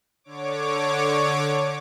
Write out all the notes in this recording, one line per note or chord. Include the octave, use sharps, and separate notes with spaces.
D3 C#5 D6